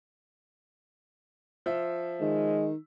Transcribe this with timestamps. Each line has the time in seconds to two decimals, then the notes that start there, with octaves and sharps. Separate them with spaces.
1.66 F3 E5
2.21 D#3 G#3